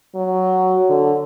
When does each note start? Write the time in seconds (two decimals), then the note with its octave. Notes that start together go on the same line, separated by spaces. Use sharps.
0.16 F#3
0.89 D3